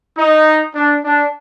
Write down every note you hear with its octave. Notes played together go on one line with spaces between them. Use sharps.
D#4
D4
D4